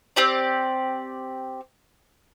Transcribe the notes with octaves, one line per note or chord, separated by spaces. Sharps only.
C4 G4 D5